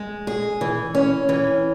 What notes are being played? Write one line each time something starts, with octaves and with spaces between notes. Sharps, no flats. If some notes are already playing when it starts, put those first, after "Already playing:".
Already playing: G#3
G#4
E3
C#4
E3